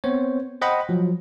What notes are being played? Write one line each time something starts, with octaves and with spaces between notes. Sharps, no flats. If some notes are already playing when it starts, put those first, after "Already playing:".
B3 C4 C5 C#5
C5 D#5 F#5 G5 B5
F3 F#3